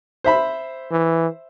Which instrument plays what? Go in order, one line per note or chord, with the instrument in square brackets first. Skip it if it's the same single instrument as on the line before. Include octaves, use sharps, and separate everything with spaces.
[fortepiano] C5 E5 B5
[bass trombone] E3